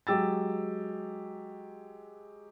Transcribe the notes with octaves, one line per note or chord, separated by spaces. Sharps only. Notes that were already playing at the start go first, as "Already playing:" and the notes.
F#3 G#3 G4 E6 A6